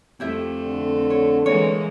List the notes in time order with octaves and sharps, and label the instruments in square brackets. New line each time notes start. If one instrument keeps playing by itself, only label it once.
[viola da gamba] F2 A3 [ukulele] E4 G4 E5
[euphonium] D3
[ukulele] C#5
[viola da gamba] E3 G#3 A#3 [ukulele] C#5